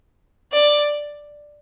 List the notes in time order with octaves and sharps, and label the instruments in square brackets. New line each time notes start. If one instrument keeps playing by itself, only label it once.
[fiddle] D5